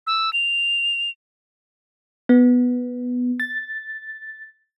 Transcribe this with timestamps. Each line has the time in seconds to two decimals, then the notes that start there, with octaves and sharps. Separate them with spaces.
0.07 E6
0.33 F7
2.29 B3
3.40 A6